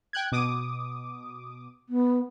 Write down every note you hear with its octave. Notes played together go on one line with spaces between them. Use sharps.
G5 F#6 G#6
B2 D6 D#6
B3